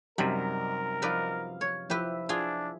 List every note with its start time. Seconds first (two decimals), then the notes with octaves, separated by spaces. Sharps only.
0.18 F#2 C3 G3 D#4 A#4
1.02 F3 D#4 B4 D5 F5
1.61 C#5
1.90 F3 E4 G4 B4 E5
2.29 D4 F4 G#4